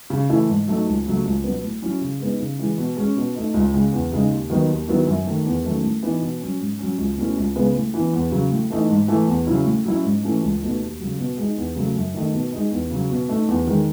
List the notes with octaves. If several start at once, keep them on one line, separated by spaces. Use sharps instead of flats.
C#3
E3 A3 E4
G#2
F#3 A3 D#4
C#2
C#3 F#3 A3
C#2
B2 F#3 B3
A2
F#3 C#4 E4
C#3
G#3 B3 D#4
C#3
E3 G#3
B2
G#3 C#4
B2
A3 D#4
C#2
C#3 G#3
E2
C#3 G#3 D#4
D#2
D#3 F#3 B3 D#4
D#2
D#3 F#3 B3 E4
F#2
D#3 A3
E2
D#3 F#3 A3 C#4
A2
E3 B3 D#4
B2
F#3 C#4
G#2
F#3 C#4
C#2
B2 A3 C#4 E4
C#2
C#3 G#3 B3
A2
E3 B3
E2
C#3 F#3
A2
E3 A3 D#4
G#2
E3 A3
E2
C#3 F#3 C#4 E4
A2
F#3 C#4 E4
G#2
E3 A3 C#4
C#2
B2 A3 D#4
D#2
C#3 F#3
B2
G#3 D#4
E2
C#3 F#3 A3
F#2
D#3 A3 D#4
B2
G#3 D#4
E2
C#3 F#3
B2
A3 D#4
E2
D#3 G#3